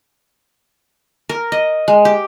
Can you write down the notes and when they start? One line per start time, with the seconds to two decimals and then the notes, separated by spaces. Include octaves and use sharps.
1.29 A#4
1.52 D#5
1.88 G#3
2.05 G4